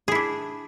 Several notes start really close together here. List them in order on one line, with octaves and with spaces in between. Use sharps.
G#4 E4 D4